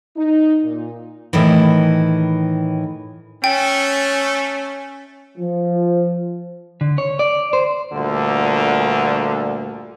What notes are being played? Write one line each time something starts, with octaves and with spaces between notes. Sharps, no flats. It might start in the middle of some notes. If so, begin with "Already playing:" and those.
D#4
A#2
A2 D#3 E3
A3 C#4 G5
F3
D3
C#5
D5
C5
D2 G2 A#2 D3